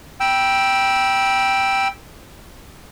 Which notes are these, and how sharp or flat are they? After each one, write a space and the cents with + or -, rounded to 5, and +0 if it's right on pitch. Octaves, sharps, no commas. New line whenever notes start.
G5 +0 B5 -35 E6 +0